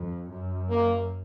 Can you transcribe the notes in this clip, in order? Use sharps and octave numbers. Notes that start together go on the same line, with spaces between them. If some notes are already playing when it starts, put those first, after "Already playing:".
Already playing: F2
F#2
A#3